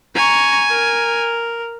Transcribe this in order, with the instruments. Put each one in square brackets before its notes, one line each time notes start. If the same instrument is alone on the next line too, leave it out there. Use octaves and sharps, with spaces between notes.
[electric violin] G#5 [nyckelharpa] A#5 C#6
[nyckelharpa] A#4